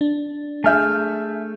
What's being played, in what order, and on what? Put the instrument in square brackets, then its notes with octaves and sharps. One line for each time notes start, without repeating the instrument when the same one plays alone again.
[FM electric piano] D4
[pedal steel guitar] A3 F6 G6 [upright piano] G#4 E5 G#5